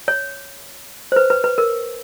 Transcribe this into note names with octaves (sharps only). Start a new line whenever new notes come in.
C#5
C5
B4
B4
B4
A#4